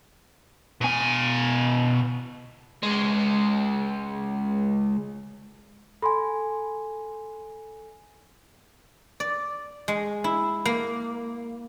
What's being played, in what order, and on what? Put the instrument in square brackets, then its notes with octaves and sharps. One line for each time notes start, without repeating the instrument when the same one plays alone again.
[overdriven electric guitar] B2 G#5
C#2 G#3
[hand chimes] A4 G#5 [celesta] B5 C6
[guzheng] D5
G#3
E4
A#3